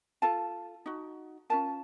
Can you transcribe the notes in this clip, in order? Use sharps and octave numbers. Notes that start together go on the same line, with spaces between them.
F4 A4 A5
D#4 F#4
C#4 F4 A#4 A5